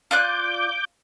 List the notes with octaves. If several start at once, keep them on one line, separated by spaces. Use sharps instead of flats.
F4 D5 D6 F#6 G6